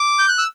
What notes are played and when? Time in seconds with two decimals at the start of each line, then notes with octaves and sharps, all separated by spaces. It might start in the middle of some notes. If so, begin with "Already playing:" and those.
Already playing: D6
0.19 G6
0.29 F#6
0.38 E6